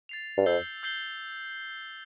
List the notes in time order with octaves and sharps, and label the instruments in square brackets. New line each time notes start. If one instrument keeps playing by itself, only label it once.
[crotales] A6 C7 F7
[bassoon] G2
[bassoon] F2 [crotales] E6 G6 C7 G7
[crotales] E6 G6 C7 G7